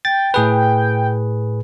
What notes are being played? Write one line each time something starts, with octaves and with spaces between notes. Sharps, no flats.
G5 A6
A2 G#4 B4